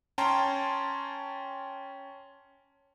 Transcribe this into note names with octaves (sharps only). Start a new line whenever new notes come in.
C#4 G5 A5 A#5 C6